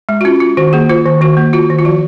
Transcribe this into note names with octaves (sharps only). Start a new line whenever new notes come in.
G#3
F#4
C#4 F4
F4
D#3 F#4
A#3 G#4
F4 C5
D#3
D#3 F#4
A#3
F4 F#4
D#3
F4
F3 F#4